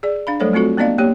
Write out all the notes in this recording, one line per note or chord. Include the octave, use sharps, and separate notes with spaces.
G#4 D5
D4 F5 B5
F#3 G3 A3 A4 C5 C#5
A3 C4 F4 F#4 A4
A#3 B3 D4 D5 D#5 F5
A#3 G4 C#5